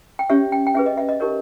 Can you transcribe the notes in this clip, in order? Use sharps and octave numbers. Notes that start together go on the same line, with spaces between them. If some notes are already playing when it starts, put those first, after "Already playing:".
G5
C#4 G4 C#5 E5
G5
G5
C#4 G#4 B4 E5
D#5
E5
D#5
D#4 G4 A#4 C#5